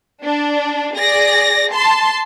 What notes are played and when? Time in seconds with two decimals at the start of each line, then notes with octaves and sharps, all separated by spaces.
0.24 D4
0.96 G#4 D5 A#6
1.72 A5 C6